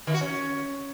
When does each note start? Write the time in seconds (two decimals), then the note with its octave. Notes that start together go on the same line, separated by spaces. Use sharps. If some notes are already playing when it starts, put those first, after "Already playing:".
0.07 D#3
0.14 F#4
0.21 C#4